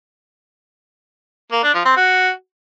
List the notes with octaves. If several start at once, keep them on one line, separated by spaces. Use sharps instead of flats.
A#3
D4
F3
C4
F#4